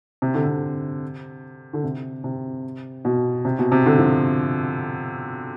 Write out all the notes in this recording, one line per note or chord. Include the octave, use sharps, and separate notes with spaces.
C3
D3
C3
D3
C3
C3
B2
C3
B2
C3
D3
F3